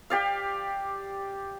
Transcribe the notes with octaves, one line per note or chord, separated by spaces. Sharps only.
G4 D5 F5